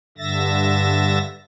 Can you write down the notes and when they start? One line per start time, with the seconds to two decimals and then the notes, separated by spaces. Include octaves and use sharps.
0.18 G2 D3 E5 A6 A#6